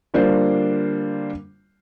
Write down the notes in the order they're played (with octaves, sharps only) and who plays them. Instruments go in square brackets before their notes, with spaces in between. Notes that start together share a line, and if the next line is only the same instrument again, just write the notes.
[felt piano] D3 G3 A#3 D4 F4 C5